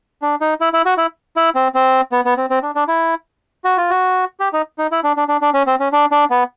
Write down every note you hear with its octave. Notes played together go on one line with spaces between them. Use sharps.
D4
D#4
E4
E4
F#4
E4
E4
C4
C4
B3
B3
C4
C4
D4
D4
E4
F#4
F4
F#4
G4
D#4
D#4
E4
D4
D4
D4
D4
C#4
C4
C#4
D4
D4
B3